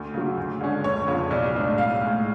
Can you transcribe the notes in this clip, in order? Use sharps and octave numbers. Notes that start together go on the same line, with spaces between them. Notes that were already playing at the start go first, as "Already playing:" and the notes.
Already playing: D2
C#3 F#3
D2
D3 G#3 C#4
F1 C#5
F2 C#3
B1 D5
A2 G#3 D4
B1 F5
A2 G#3